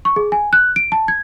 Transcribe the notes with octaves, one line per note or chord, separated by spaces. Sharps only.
C#6
G#4
G#5
F#6
D7
A5
G#6